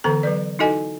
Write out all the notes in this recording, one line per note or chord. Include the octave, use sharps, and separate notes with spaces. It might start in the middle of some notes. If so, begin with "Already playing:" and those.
D3 E3 B3 A4 A#5
F#3 B4 D5
D#4 E4 F#4 A4 D#5 G#5